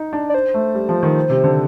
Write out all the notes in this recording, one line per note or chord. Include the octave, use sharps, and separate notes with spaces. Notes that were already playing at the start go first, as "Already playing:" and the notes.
Already playing: D#4
D4
D5
C5
A3
G3
F3
D#3
C3
D3